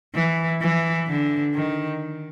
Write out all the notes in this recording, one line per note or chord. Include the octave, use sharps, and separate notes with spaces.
E3
E3
D3
D#3